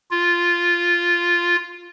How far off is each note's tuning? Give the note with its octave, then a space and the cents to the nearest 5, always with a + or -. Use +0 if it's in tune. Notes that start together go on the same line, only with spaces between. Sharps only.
F4 -5